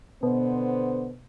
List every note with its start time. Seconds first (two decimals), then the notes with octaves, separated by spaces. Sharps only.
0.23 B2 D3 B3 C5